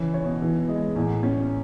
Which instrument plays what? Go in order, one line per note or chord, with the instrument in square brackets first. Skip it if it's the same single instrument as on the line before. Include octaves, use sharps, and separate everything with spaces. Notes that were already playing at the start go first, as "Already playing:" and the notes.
Already playing: [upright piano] C#3 C#5 [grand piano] E3
[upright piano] C#5
[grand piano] B2
[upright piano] E3
G#3
[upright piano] E2 [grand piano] A2
[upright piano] C#4